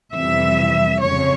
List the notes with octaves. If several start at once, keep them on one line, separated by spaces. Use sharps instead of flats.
F2 C3 E3 G3 E5
F2 C#3 F3 C#5